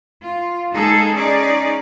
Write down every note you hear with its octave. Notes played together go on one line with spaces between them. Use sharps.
F4
G#3 A#3 D#4 G#4 A4
C#4 D#4 G#4 D5